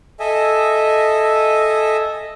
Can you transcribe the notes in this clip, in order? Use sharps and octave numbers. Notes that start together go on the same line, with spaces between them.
A4 D#5 E5 G#5